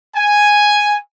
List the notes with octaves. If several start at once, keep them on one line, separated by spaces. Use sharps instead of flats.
G#5